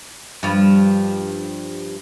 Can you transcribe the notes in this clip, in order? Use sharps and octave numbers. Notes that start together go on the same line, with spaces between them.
G2 F3